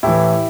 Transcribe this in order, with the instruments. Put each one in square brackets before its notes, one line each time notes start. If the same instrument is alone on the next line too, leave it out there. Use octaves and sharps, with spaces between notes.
[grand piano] A2 E3 E4 G4